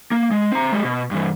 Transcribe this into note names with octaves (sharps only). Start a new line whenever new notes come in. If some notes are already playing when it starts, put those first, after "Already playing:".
A#3
G#3
C4 A#5
G#3 G4
B2
G2 E3